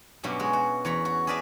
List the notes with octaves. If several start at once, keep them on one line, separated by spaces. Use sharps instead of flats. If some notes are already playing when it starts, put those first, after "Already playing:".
G2 B2 F#3 A#3 C#4
G#3 F#4 G#4
F#4
E2 C#5 A#5 B5
F#4
G#4 A#4 B4 D5 E5 A5